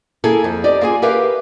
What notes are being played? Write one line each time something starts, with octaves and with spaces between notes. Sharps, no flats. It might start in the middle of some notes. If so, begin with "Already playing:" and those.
A#3 E4 G#4 A4
F2
G4 D5 D#5
A#3 F4 G#4 G#5
G4 A#4 B4 E5 F5